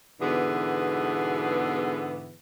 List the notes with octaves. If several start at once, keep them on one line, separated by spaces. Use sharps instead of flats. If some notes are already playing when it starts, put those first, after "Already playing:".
G#2 B2 D3 E3 B3 G#4